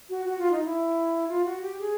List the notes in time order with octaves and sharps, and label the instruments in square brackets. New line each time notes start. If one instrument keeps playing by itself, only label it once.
[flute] F#4
F#4
F4
D#4
E4
F4
F#4
G4
G#4